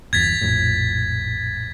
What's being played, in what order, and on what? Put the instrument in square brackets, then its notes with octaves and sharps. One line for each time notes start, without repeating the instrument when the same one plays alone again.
[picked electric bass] G1 E2 [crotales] G#6 A6 B6
[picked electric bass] A#1 F2 A2